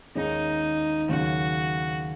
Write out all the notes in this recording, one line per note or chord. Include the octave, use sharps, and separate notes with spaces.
D#2 D#3 G#3 C#4 D#4
D#2 C#3 F#3 F#4